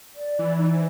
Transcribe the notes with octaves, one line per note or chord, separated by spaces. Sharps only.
D5
E3
D#4
C5